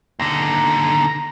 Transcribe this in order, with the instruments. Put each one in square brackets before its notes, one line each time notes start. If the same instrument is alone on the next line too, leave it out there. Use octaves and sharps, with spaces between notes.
[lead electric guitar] D#2 D3 [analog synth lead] A#5